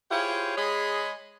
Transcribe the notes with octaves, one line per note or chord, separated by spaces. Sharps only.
E4 F4 G4 G#4 C5 C#5
G#3 G#4 C#5 D#5 B5